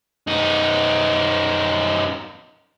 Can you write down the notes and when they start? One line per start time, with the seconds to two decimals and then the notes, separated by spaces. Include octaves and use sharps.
0.27 F#2 D#4